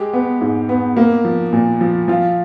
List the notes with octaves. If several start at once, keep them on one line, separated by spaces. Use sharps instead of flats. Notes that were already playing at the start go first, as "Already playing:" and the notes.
Already playing: G#3 G4
B3
G#2
B3
A#3
F3
A#2
F3
F3 F4